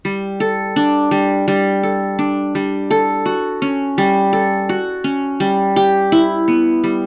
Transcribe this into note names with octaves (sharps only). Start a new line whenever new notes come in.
G3
A4
D4
G3
G3
A4
D4
G3
A4
F#4
C#4
G3
A4
F#4
C#4
G3
G4
E4
B3
G3